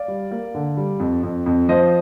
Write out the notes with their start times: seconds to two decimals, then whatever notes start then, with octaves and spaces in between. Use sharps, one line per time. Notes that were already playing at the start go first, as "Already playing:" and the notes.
Already playing: D5 F5
0.08 G3
0.31 A#3
0.55 D3
0.77 G3
1.00 F2
1.23 F2
1.46 F2
1.69 F3 C5 D#5